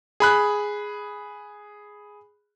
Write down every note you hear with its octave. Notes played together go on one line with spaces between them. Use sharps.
G#4 B5 F#6